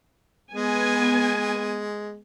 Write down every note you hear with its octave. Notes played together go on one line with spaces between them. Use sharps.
G#3 B3 G#5